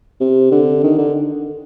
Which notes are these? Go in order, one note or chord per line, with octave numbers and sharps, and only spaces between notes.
C3
D3
D#3
D3